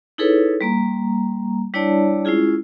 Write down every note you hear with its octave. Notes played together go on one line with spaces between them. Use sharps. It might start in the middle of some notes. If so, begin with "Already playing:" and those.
D#4 E4 G#4 A4 B4 C#5
G3 A#3 A#5
G3 D4 E4 C#5 D5 A5
G#3 C#4 E4 F4 G#4